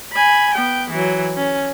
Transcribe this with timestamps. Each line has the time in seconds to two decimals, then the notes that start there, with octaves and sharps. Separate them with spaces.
0.12 G#5 B5
0.55 B3 G5
0.90 E3 F#3
1.37 C#4